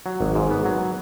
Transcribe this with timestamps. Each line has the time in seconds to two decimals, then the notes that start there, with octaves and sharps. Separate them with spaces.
0.06 F#3
0.21 G#1
0.35 G#2
0.51 B3
0.65 F#3